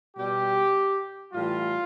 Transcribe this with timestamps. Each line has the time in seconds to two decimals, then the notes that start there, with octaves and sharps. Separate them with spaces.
0.16 B2 G3 G4
1.33 A2 E3 G3 F4